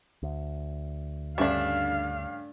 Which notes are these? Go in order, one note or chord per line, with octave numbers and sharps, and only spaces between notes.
D2
G2 C#3 A3 D4 F5